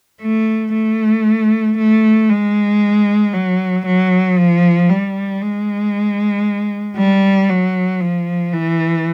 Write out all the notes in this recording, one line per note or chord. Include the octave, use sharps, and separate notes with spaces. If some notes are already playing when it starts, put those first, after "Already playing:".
A3
A3
A3
G#3
F#3
F#3
F3
G3
G#3
G3
F#3
F3
E3